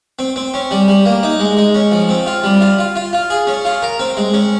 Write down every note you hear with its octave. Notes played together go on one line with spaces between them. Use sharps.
C4
C4
C#4
G3
G3
A#3
D#4
G#3
G#3
C#4
F3
C4
F4
G3
F4
F4
F4
F4
G#4
C#4
F4
A#4
C4
G#3
C#4